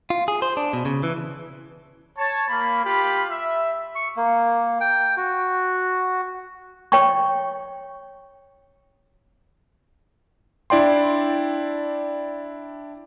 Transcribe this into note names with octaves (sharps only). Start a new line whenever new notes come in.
F4
G#4
C5
D4
B2
C#3
E3
C#5 A5
A#3 B5
F4 G4 B5
E5
C#6
A#3
G5
F#4
C#5 G5 C#6
D4 E4 D5 G5 C6